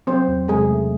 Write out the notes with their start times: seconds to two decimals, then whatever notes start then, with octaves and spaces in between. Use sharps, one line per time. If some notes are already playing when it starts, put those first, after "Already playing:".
0.07 F#3 C4 C5
0.28 E2
0.48 C3 G#3 G#4
0.69 A3